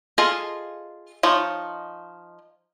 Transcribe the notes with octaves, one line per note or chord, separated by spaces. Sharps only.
F4 G#4 A4 D#5 F5
F3 D#4 C#5